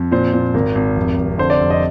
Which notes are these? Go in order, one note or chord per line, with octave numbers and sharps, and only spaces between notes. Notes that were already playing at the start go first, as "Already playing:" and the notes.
Already playing: F2
A#2 C5
A#2
G#1 A#4
G#1
F1
F1
D3 C5
D5
F1
D#5